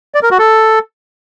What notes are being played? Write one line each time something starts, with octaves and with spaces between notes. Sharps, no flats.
D5
A#4
F#4
A4